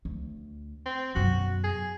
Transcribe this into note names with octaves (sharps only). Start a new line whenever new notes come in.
D2
C4
F#2 B2 F#4
G#4